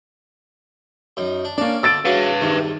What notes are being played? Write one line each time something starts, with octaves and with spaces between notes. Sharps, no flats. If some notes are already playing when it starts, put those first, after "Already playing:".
F#2 D#4
D4
A#3 C#4 D4 D5
D2 D3 E6 A6 D7
C#3 E3 F#4 B4 F5
E2 G2 C3 D#3